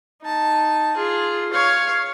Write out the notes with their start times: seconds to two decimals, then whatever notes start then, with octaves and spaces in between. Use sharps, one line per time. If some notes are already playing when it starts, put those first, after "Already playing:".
0.23 D#4 A5
0.97 F4 G#4
1.52 C#5 F5